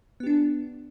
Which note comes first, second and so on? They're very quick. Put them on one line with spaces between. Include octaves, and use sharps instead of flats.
B3 G4 D4